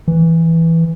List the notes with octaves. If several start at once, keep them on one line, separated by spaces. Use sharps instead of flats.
E3